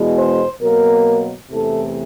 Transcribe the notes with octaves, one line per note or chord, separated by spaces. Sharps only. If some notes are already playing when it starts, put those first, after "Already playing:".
Already playing: E2 B2 G#3
C5
B2 F#3 A#3 A#4
E2 C3 E3 A3 A4